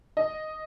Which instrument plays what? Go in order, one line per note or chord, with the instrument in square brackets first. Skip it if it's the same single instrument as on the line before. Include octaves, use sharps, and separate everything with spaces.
[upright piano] D#5